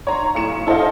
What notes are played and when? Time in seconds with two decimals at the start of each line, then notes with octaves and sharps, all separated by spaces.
0.07 C#5 A#5 C6
0.35 B1 A2 C#7 E7
0.67 E4 A4 C5 D#5 F5